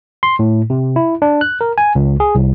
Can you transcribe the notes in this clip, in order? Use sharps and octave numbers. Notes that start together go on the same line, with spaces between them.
C6
A2
C3
E4
D4
F#6
A#4
G#5
C#2
G#4
C2